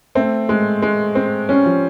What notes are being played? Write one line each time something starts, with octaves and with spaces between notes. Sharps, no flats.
A3 C4
G#3
G#3
C4
G3 C#4
F3